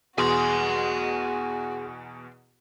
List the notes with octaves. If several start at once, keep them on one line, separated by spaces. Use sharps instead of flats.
E2 B2 F#4 G#4 G#5 C6